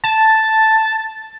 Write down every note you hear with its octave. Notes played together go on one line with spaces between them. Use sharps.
A5